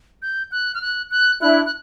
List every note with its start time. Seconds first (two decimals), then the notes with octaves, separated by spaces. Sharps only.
0.22 G6
0.52 F#6
0.75 F6
0.82 F#6
1.11 F#6
1.41 D4 E4 F#6
1.66 F#6